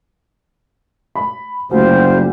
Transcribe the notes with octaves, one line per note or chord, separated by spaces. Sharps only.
B5
F#1 D2 G3 F4 G4 C5